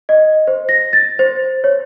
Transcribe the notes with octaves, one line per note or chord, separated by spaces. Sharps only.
D#5
C5
A#6
A6
C5
C#5